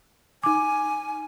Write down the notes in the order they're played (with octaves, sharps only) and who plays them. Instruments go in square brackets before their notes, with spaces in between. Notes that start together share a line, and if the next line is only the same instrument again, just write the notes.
[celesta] D#4 D6 [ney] G#5